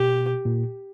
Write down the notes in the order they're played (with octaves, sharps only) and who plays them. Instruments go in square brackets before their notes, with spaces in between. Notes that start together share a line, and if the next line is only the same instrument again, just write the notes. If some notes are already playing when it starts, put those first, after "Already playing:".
Already playing: [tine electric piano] B2 [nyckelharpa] G4
[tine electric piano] A#2